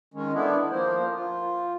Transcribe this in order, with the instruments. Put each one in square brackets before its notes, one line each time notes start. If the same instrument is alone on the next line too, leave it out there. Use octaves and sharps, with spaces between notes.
[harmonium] D#3 G#3 C#4
A3 B3 D4 E4
F3 A#3 C5
F4